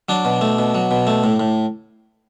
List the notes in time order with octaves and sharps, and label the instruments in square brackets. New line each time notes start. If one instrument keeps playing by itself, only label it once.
[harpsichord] F#3 D4
B2
A3
B2
F#3
B2
A3
A2
A2